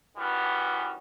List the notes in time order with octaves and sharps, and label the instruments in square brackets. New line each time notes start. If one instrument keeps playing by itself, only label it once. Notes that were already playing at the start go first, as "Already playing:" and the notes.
[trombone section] D#3 E3 G3 B3 C#4 F#4